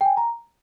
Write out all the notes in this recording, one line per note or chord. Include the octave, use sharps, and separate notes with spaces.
G5
G#5
A#5